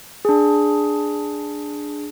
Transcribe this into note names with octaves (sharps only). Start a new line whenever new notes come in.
D4 G#4